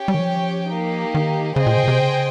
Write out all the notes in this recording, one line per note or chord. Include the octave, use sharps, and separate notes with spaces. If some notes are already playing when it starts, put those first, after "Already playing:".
Already playing: C#4 G4 C#5 G5
G3
D#3
F3
A#3 D#4 G4
D#3
C#3 G#4 C5 D#5 G5
A#2
C#3
A#2
C3
C#3